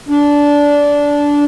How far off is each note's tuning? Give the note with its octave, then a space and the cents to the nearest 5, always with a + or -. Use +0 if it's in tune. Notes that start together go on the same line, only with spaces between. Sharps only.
D4 -15